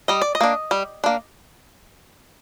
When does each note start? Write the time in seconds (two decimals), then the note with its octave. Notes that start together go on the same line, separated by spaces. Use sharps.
0.08 G3 D#5
0.22 D5
0.35 D#5
0.41 A#3 D4
0.71 G3
1.04 A#3 D4